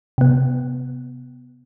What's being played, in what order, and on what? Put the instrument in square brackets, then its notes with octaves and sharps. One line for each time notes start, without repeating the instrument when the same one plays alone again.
[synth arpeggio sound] C3 B3